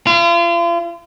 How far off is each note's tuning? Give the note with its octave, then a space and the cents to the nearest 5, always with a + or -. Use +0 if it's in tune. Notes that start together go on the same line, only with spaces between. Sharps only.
F4 -40